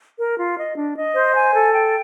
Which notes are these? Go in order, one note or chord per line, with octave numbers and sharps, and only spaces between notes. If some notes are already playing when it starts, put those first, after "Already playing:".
A#4
F4
D#5
D4
D#5
C5
G#5
A4
G5